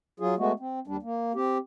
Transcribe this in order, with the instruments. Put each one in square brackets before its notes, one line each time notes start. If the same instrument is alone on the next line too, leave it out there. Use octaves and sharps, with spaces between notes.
[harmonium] F#3 F4 G#4
G#3 A3 B3 F#4
C4
D#2 G3 D4
A#3
C4 G4